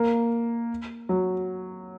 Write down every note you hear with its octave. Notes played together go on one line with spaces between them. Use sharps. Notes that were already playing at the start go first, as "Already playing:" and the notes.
Already playing: A#3
F#3